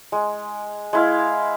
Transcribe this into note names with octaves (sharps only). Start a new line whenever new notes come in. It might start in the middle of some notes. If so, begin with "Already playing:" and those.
G#3
G#3 E4 F5